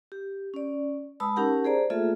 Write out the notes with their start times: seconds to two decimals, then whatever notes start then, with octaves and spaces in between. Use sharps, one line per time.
0.12 G4
0.54 C#4 D5
1.20 G#3 B4 A5 B5 D#6 E6
1.36 C#4 D#4 G4 A#4 F#5 A5
1.64 G#4 C5 D5 A#5
1.90 A3 A#3 F4 G#4 A4 E5